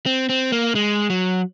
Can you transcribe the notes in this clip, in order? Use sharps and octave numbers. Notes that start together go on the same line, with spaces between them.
C4
C4
A#3
G#3
F#3